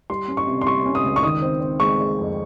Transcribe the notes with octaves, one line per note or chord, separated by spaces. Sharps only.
G3 C6
C#4
C#6
C3
C6
G3 C#6
C#4
D#6
C#2
C#6
D#3 D#6
C4
C4
G#3 C#6
G#3
F2